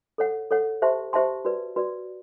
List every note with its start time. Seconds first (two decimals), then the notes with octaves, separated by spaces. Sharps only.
0.18 A4 C#5 F#5
0.51 A4 C#5 F#5
0.82 G4 C5 E5 A5 C6
1.13 G4 C5 E5 A5 C6
1.45 F#4 B4 D5
1.76 F#4 B4 D5